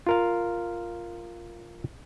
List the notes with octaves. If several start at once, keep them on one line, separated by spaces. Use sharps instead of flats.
F4 A#4 F5